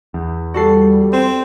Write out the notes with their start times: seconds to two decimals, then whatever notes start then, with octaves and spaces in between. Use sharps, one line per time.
0.14 E2
0.54 G3 F#4 A4 C7
1.13 C4 E7